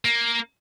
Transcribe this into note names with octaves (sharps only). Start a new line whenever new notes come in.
A#3